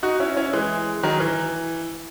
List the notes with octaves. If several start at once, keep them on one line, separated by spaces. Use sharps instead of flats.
D#4 F#4
C#4 E4
C#4 E4
E3 G#3
D#3 F#3
E3